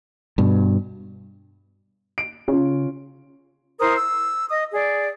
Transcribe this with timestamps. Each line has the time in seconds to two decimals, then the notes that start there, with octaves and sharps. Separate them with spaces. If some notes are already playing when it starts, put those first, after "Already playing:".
0.38 G2 B2
2.18 D7
2.48 C#3 C#4 F4
3.79 E4 A#4 C5 D#6
3.97 E6
4.50 D#5 D#6
4.73 G#4 D5